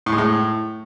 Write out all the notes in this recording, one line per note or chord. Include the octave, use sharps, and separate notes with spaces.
A2
G#3
A2